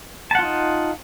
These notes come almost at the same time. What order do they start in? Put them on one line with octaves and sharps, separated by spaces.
A5 F#5 F4 D#4